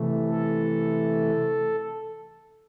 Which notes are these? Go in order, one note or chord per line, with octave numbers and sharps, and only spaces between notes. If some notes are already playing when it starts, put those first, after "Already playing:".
Already playing: C3 E3 A3
A4